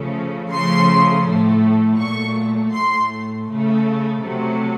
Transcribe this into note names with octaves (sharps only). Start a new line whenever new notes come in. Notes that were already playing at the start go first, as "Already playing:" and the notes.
Already playing: C#3 F3 A3
C#3 F3 A3 C6
A3
A2
A#2 F#3 A3 C#6
A2 A3 C6
C#3 A3
C3 F#3 A3